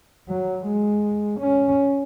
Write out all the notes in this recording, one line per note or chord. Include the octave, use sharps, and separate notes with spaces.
F#3
G#3
C#4